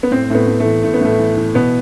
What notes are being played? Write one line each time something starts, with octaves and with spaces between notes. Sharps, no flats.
B3
A2 C4
A2 A3 B3
A2
A3
E3
A2 A3
B3
A2 A3
E3
E3
B2 B3